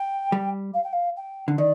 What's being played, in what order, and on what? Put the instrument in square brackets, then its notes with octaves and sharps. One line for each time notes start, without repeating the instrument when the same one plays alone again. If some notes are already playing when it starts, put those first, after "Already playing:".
Already playing: [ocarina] G5
[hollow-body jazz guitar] G3
[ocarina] F5
G5
F5
G5
[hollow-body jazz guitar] D3
[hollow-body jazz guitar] D#3 [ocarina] D5